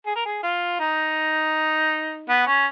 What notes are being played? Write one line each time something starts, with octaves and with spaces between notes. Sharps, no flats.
G#4
A#4
G#4
F4
D#4
B3
C#4